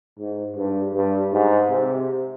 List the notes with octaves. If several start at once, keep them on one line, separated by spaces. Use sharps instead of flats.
G#2
G2
G2
G#2
C3